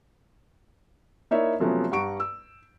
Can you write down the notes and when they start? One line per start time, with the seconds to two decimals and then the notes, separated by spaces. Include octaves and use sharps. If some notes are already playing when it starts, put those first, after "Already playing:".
1.31 A#3 D#4 E4 C#5 D5 E5
1.60 C3 F3 F#3 A3 B3 C#4
1.91 G2 F#5 A#5 C#6 D7
2.20 E6